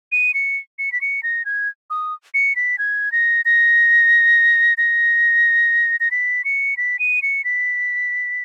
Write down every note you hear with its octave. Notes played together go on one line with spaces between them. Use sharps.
D#7
C#7
C#7
B6
C#7
A#6
G#6
D#6
C#7
B6
G#6
A#6
A#6
A#6
A#6
B6
C#7
B6
D#7
C#7
B6